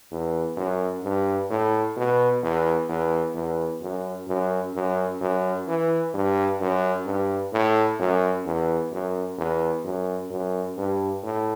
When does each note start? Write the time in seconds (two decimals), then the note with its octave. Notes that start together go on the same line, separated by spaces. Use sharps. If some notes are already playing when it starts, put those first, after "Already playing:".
0.11 E2
0.57 F#2
1.04 G2
1.50 A2
1.97 B2
2.43 E2
2.89 E2
3.35 E2
3.81 F#2
4.28 F#2
4.75 F#2
5.21 F#2
5.68 E3
6.14 G2
6.61 F#2
7.06 G2
7.53 A2
7.99 F#2
8.46 E2
8.92 F#2
9.38 E2
9.84 F#2
10.31 F#2
10.78 G2
11.23 A2